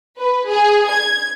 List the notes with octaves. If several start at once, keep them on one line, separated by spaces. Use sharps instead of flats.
B4
G#4
G#6